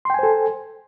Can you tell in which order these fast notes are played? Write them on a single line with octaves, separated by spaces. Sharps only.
C6 G5 G#5 C5 A4